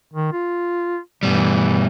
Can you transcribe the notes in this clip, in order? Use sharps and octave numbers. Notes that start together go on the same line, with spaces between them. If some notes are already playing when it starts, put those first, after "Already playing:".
D#3
F4
G2 B2 E3 G3